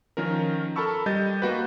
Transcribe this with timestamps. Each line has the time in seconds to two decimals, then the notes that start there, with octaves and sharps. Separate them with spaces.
0.17 D#3 F3 C#4 A#4
0.76 A4 A#4 A5 B5 C#6 E6
1.06 G3 D#5 G6 A6
1.42 A#3 F#4 B4